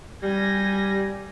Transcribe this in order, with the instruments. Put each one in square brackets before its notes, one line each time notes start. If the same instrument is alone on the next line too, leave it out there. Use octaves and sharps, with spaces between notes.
[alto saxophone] G3 [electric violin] G#5 A#6